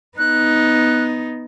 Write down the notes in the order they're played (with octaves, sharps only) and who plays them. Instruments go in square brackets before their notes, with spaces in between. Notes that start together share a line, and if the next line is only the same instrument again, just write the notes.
[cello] B3 D#4 [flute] F#6